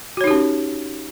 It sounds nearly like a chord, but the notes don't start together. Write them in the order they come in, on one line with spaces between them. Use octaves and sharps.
F#4 C#5 D#4 G4 C#4